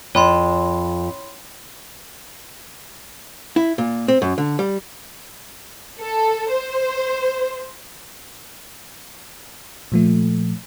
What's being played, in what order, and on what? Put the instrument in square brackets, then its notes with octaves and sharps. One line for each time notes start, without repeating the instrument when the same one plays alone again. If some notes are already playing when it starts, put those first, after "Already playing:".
[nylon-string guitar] F2 [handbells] C#5 B5 C6
[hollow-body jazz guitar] E4
A#2
C4
F#2
D3
G3
[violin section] A4
C5
[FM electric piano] A#2 F3 A3